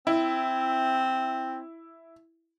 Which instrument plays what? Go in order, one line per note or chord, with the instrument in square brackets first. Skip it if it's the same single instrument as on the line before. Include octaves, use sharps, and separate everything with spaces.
[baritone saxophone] C4 [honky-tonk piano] E4